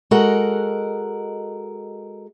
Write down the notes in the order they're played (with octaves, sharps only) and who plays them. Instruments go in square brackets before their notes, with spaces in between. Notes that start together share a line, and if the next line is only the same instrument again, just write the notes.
[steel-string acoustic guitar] G#3 F#4 A4 A#4 D#5 F#5